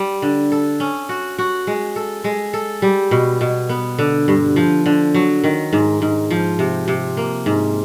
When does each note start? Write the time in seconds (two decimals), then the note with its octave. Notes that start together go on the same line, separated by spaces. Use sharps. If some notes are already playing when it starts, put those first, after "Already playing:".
Already playing: G3
0.22 D3
0.52 A4
0.80 C#4
1.09 F#4
1.38 F#4
1.67 G#3
1.96 A4
2.24 G#3
2.54 A4
2.82 G3
3.11 B2
3.41 B2
3.69 B3
3.99 D3
4.28 G2
4.56 F3
4.86 D3
5.15 F#3
5.44 D#3
5.73 G#2
6.02 G#2
6.31 F3
6.59 C3
6.88 C3
7.17 A#3
7.46 G#2